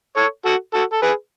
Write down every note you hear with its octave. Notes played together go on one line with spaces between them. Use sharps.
A4 C#5
F#4 A4
F#4 A4
A4
G#4 B4